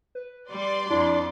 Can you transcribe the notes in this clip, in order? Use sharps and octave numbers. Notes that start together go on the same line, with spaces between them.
B4
G3 D5 C6 D6
F2 D4 E4